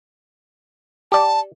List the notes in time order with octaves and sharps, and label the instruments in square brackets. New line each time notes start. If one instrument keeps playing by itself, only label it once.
[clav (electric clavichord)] G4 D5 [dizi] A5